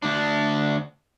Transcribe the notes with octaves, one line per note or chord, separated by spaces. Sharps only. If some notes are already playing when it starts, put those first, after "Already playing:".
D2 D4